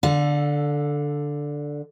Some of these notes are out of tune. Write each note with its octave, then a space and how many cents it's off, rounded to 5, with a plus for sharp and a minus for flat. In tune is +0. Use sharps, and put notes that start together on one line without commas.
D3 +0 A4 +0 F5 +40